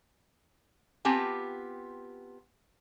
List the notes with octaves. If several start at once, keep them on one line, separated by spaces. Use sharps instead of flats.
B3 C4 F4 G4 G#5 A5